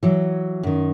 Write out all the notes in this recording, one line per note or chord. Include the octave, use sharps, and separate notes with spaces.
E3 F#3
F#2 D#3